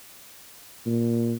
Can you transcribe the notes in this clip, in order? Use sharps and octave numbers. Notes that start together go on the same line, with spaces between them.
A#2